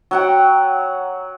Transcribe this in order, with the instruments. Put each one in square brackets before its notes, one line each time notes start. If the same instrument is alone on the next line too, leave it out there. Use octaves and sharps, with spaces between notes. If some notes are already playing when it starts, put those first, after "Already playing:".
[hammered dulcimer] F#3 F#5 G5